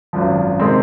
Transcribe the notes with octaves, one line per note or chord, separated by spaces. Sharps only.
G#1 F#2 F3
C3 D#3 G#3 C4